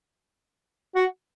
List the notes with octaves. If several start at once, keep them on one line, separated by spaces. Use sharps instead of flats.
F#4